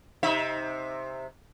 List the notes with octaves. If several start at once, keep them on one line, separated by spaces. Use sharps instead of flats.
C3 D#4 E5